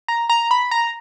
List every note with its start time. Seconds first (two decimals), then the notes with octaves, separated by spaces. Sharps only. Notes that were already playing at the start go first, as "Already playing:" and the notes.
0.08 A#5
0.30 A#5
0.51 B5
0.71 A#5